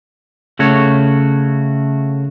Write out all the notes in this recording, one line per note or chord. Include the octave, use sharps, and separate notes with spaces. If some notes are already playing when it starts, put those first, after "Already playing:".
C#3 A3 F#4 C#5